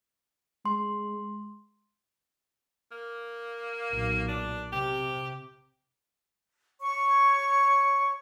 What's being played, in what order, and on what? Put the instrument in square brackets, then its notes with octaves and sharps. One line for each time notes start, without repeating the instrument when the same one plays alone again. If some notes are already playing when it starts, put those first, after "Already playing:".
[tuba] G#3 [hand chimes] C6
[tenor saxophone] A#3
[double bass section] B1 A#2
[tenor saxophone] D4
[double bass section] C3 [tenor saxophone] G4
[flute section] C#5 C#6